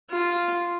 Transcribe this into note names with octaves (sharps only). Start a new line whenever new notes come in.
F4